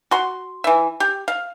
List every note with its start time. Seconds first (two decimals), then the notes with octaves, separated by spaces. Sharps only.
0.11 F#4 C6
0.64 E3 E5
1.00 G4
1.28 F5